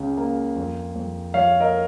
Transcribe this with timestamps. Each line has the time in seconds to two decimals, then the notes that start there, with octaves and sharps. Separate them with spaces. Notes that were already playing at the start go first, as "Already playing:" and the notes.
Already playing: C#2 C#3
0.17 A#3
0.56 F2
0.95 F2
1.34 F3 C#5 F5
1.60 A#4 D#5